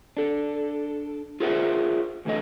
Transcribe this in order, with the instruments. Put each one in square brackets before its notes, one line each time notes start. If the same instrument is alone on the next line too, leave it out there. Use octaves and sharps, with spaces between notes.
[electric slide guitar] D4 A4
F4 G#4 A#4 C5 E5 F#5
E2 A2 D3 A3 D#5